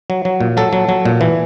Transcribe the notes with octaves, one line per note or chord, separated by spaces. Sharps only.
F#3
F#3
A#2
F#3 A4
F#3
F#3
A#2
E3